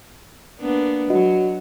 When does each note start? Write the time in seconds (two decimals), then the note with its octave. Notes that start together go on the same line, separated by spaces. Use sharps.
0.60 A#3 B3 D4
1.10 F#3 F#4 D#5